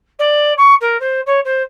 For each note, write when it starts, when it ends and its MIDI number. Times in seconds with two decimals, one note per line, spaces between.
0.19 0.53 74
0.57 0.74 85
0.80 0.99 70
1.00 1.20 72
1.26 1.39 73
1.44 1.62 72